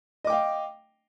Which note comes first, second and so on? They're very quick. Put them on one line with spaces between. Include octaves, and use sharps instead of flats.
D#5 D6 G5 F5